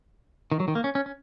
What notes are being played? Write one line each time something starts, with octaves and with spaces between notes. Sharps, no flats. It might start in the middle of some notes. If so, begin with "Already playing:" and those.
D#3
F#3
D#3
A#3
C#4
C#4
C#4